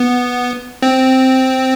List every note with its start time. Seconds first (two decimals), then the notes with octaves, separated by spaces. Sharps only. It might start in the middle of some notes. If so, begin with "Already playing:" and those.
Already playing: B3
0.82 C4